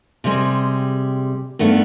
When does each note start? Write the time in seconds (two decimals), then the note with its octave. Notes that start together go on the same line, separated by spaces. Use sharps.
0.24 C3 G3 G#3
1.59 G2 D#3 A3 B3